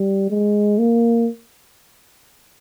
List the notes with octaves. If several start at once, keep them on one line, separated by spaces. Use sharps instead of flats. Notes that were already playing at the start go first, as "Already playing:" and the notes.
Already playing: G3
G#3
A#3